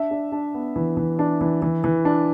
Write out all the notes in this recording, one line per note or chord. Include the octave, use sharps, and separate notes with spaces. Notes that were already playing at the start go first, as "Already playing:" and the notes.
Already playing: D4 E5
D4
D4
B3
E3
E3
D4
E3
E3
E3
D4